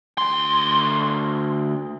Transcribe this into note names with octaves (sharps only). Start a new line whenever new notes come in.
D2 C6